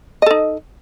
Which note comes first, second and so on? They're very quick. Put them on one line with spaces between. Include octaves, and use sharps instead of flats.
D#5 A4 D#4